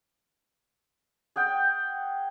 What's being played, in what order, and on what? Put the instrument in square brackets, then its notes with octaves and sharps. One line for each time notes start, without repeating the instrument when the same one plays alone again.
[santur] G#4 F#5 G5